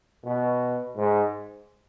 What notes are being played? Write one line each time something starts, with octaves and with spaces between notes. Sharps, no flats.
B2
G#2